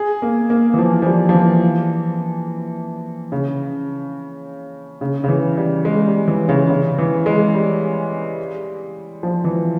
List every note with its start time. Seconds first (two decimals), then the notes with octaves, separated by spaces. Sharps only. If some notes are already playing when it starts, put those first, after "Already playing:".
Already playing: G#4
0.22 A#3
0.50 A#3
0.74 E3
0.79 F3
1.02 F3
1.06 G3
1.29 F3
1.34 E3
3.32 C#3
5.01 C#3
5.24 C#3
5.28 E3
5.57 G3
5.85 G#3
6.07 G3
6.28 E3
6.49 C#3
6.69 C#3
6.98 E3
7.26 G#3
7.54 G3
9.23 F3
9.44 E3